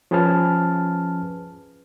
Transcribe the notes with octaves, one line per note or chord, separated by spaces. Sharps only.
F3 C#4 G#4 B4 A5 F6